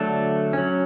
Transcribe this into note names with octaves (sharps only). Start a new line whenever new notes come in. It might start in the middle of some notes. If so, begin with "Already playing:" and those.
Already playing: D3 F#3 A3 D4 A4
F#3 C#4